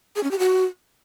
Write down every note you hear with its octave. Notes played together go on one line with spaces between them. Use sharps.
G#4
C#4
G4
F#4